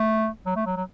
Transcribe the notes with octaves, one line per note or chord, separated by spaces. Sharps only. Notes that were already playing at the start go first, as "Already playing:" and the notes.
Already playing: A3
F#3
A3
F#3
F#3